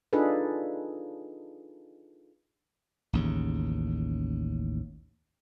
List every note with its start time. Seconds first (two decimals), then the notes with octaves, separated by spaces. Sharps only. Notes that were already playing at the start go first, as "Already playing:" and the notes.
0.13 D4 D#4 F4 G#4 A4 B4
3.13 A1 D#2 C#3